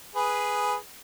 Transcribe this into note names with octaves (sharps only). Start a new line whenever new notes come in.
G#4 B4